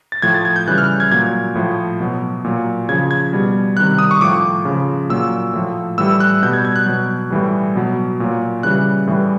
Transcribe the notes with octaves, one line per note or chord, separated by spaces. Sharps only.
A6
A2 F3 G#6
A6
G#6
G6
C#3 E3 G3 F#6
F6
G#6
A#2 F#3 G#6
A2 F3
B2 F#3
A#2 F#3
C#3 F3 G#6
G#6
B2 G3
C3 D#3 G3 F#6
D#6
C#6
A2 F3 D6
C#3
F3
A#2 F#3 E6
A2 F3
A2 E3 G3 E6
F#6
B2 G3 G6
G#6
G#6
F#6
B2 F#3
A2 E3 G3
B2 F#3
A#2 F#3
C#3 E3 G3 F#6
A2 E3 G3